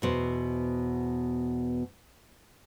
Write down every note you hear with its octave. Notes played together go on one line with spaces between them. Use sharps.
E2 B2 C5